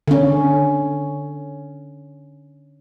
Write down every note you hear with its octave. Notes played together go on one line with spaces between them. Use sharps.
D3 C#4